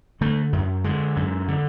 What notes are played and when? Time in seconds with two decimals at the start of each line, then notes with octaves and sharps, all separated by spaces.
0.21 D3 A3
0.53 F#2
0.84 D3 G#3
1.16 F#2
1.48 D3